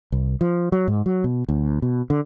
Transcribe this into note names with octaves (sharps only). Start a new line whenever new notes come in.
C2
F3
F#3
G#2
F#3
B2
D2
B2
D3